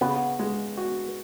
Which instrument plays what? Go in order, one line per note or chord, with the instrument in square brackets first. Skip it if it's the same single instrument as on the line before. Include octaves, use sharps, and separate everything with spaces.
[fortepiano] C#3 [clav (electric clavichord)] B3
[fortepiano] G#3
F#4